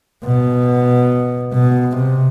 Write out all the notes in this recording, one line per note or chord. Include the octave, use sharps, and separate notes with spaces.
B2
B2
C3